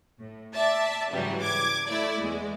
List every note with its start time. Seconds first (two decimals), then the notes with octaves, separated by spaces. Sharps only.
0.19 A2
0.53 D5 E5 A5
1.12 G#2 C#3 E3 F#3 G3
1.42 D6 G#6
1.88 A3 E4 D5
2.20 E2 G#3